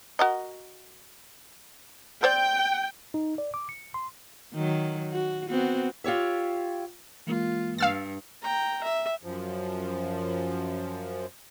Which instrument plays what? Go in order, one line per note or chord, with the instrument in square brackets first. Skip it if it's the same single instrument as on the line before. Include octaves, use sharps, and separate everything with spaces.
[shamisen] F#4 A#4 D#5
[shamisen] C4 C5 D5 [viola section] G5
[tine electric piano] D#4
D5
D6
C#7
C6
[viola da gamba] D#3 F#3
F#4
B3 C4 F#4
[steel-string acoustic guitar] F4 G4 C#5 E5
[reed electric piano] E3 G#3 A#3 [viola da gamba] F4
[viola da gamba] G2 [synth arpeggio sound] F5 E6 A6
[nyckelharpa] G5 A#5
E5
[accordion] F#2 F3